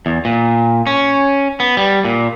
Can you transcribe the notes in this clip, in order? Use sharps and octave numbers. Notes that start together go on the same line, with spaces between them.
E2
A#2
C#4
B3
G3
A#2